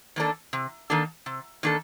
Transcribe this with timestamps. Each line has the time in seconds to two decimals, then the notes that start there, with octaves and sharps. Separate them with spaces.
0.16 D#3 A#3 D4 A4
0.53 C3
0.90 D#3 A#3 D4 A4
1.26 C3
1.63 D#3 A#3 D4 A4